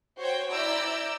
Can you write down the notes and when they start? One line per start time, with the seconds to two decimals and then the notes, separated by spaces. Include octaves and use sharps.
0.19 F#4 C5 C#5 G5
0.51 E4 D5 A#5 E6 G6 D7